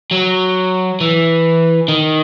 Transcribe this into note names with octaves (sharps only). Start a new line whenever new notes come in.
F#3
E3
D#3